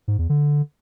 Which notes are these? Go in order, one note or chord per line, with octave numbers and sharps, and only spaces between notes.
G#2
E2
D3